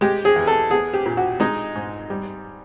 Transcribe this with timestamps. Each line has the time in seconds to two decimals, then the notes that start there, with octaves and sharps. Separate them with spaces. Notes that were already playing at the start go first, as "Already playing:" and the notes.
0.01 G#3 G4
0.25 G#4
0.36 E2
0.47 A4
0.71 B3 G#4
0.93 G4
1.06 A#2
1.17 F#4
1.40 G#3 D#4
1.75 G#2
2.10 G3